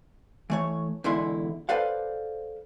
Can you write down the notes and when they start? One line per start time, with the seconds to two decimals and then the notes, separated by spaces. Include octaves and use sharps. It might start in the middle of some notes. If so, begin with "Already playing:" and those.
0.50 E3 A3 C#5
1.04 E2 B2 D3 G#3 E4 C6
1.69 A4 B4 C5 D5 F5 F#5